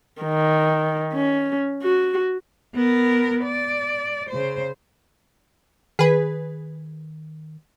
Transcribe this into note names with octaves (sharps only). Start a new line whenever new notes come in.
D#3
C#4
F#4
B3 A#4
D5
C#3 C5
D#3 G#4 B4